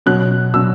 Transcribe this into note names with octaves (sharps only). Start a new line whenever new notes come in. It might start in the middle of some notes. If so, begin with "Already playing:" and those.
B2 F#3 C#4 F#6
B2 F#3 C#4 E6